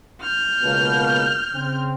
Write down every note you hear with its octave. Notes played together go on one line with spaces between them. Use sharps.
F6 G6
C#2 B2 A#3
C#3 C4 G5